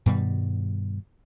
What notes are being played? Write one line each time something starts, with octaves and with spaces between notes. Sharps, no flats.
G2 B2 D#3 G3